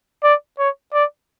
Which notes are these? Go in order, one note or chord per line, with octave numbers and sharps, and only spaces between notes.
D5
C#5
D5